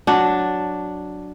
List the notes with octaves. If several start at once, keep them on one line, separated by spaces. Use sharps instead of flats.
F#3 D4